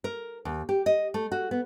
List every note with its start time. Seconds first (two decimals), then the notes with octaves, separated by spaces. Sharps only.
0.04 A#4
0.45 D#2
0.69 G4
0.86 D#5
1.14 A3
1.32 F#4
1.51 B3